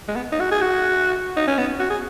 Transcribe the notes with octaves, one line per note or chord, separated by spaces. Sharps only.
G#3
B3
D#4
F#4
G#4
F#4
D#4
C#4
B3
F#4
G#4